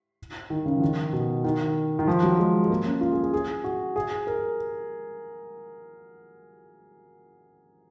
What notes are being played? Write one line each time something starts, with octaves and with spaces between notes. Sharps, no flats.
D#3
C#3
F3
D#3
B2
D#3
D#3
F3
F#3
G#3
G#3
A#3
C#4
F4
G#4
G#4
G#4
F#4
G#4
A#4